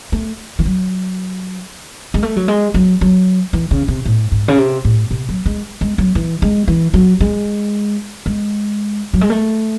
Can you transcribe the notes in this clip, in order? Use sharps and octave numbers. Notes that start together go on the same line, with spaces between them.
A3
E3
F#3
G#3
A3
F#3
G#3
F#3
F#3
E3
C#3
C3
A2
G#2
C#3
C3
A2
C3
F#3
G#3
G#3
F#3
E3
G#3
E3
F#3
G#3
G#3
F#3
G#3
A3